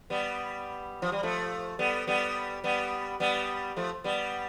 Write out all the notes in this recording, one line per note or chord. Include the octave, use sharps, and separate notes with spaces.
G3 B3
F3
G3
F3 A3
G3 B3
G3 B3
G3 B3
G3 B3
F3 A3
G3 B3